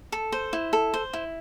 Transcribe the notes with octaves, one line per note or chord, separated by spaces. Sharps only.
A4
C5
E4
A4
C5
E4